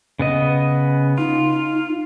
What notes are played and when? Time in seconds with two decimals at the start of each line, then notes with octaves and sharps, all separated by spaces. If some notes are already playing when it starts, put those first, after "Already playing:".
0.19 C#3 B3 D#5
1.18 D#4 F4